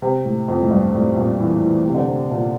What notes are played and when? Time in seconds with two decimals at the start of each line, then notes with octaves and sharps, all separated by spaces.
0.02 C3
0.25 A2
0.48 F2
0.61 A2
0.71 G2
0.94 A2
1.16 A#2
1.39 E3
1.62 E3
1.85 C3
1.95 D3
2.05 C3
2.31 A#2